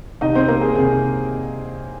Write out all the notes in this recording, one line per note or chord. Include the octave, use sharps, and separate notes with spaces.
C2 C3 D#3 D#4 D#5
C4 C5
A#3 A#4
G#4
C2 C3 D#3 G#4